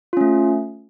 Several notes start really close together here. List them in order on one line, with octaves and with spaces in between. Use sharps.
F4 C#4 A3